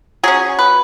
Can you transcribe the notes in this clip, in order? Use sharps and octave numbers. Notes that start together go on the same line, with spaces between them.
F#3 C#4 G#4
B4